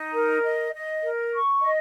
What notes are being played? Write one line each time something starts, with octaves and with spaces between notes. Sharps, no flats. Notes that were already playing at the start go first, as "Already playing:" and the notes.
Already playing: D#4
A#4
D#5
D#5
A#4
C#6
D#5